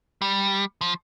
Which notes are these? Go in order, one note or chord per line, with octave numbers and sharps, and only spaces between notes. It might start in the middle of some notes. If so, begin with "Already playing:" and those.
G3
F3